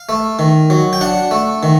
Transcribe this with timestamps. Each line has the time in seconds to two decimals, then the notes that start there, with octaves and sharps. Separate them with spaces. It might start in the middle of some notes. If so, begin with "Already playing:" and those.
Already playing: F5
0.09 A3
0.39 D#3
0.70 F#3
0.93 G5
1.01 D4 F#5
1.31 A3
1.63 D#3